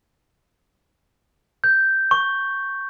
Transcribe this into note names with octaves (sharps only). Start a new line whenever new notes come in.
G6
C#6